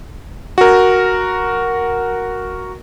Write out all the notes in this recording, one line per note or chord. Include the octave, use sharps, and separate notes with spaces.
F#4 A#4